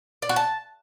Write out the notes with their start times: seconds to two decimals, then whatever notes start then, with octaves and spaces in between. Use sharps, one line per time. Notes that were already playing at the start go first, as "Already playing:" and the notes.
0.22 D5
0.29 F#4
0.36 A5